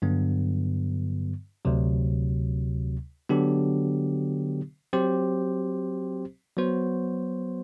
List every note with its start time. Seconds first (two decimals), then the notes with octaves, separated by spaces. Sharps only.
0.02 G2 D3 F#3 B3
1.65 D2 C3 F#3
3.29 D3 F#3 B3 D4 G4
4.93 F#3 C4 G4 C5
6.56 F#3 B3 F#4 C5